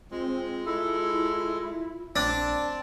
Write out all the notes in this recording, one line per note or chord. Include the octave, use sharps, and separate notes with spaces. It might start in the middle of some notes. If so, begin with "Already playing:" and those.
G#3 C4 F4
G#3 E4 A4
A#1 C4 D4 D5 A5